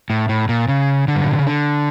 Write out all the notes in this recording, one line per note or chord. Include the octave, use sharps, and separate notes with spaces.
A2
A2
A#2
C#3
D3
G2
A2
A#2
C#3
D3